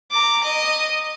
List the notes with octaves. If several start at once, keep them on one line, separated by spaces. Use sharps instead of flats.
A#5 D6
D#5